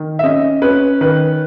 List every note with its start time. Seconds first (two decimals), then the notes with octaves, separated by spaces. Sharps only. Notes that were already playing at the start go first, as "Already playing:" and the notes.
Already playing: D#3
0.19 E5
0.24 C#4 D#5
0.62 C#4 B4
1.01 D#3 B4